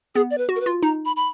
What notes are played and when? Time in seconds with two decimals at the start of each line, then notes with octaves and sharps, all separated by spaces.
0.15 B3 G#4
0.30 D5
0.38 B4
0.49 F#4
0.56 A#4
0.61 B4
0.66 F4
0.83 D#4 A#5
1.05 B5
1.16 B5